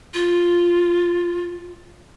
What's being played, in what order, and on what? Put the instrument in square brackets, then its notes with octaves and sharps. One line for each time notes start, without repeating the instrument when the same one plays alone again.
[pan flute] F4